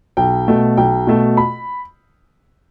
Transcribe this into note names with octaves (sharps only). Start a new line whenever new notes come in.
B1 G5
B2 A3
B1 G5
B2 A3
B5